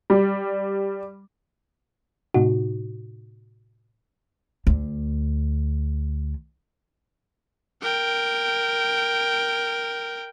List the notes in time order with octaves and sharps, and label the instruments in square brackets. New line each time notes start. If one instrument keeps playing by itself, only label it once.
[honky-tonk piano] G3
[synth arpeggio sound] A2 C3 D#4 F#4
[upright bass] D2 D3
[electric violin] A#4 G5